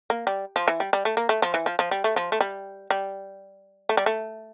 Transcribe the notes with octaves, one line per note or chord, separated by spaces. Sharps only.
A#3
G3
F3
E3
G3
G3
A3
A#3
A3
F3
E3
F3
F3
G3
A3
F3
A3
G3
G3
A3
G3
A3